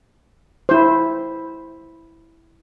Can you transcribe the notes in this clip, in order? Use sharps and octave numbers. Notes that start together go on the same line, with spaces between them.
E4 C5